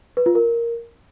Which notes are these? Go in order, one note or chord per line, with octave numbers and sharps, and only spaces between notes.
B4
F4
A#4